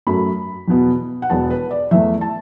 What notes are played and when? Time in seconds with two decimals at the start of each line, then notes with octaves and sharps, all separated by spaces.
0.07 F#2 F#3 A3 B5
0.68 E2 B2 B3
1.22 F#5
1.30 E1 E2 B2 B3 A5
1.50 B4
1.71 D5
1.91 E2 E3 A3 E5
2.21 A5